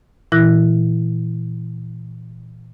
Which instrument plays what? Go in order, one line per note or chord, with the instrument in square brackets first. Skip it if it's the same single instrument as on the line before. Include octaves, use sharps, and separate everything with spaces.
[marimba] A#2 E3 E4 F#6 A#6